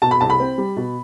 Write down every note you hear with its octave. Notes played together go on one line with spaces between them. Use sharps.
B2 A5
B5
C2 A5
B5
C4
G3
B2